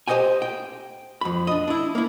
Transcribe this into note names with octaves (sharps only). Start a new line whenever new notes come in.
G4 C5 D5 D#5 G5 G#5
G5
F2 B5
D4 D#5
D4 E4
A#3 E4